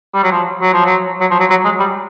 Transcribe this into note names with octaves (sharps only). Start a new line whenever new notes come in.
G3
F#3
F3
F#3
F3
F#3
F#3
F3
F#3
F#3
G#3
G3